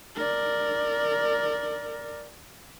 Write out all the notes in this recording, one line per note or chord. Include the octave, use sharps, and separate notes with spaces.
A#4 D5